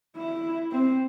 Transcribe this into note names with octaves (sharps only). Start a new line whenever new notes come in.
E4
C4